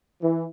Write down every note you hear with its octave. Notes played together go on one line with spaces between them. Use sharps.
E3